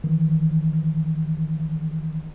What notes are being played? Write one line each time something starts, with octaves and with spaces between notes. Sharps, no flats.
D#3 E3